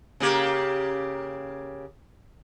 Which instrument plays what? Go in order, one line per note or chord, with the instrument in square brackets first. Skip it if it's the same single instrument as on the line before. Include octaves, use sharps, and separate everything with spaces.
[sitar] C#3 A#3 G4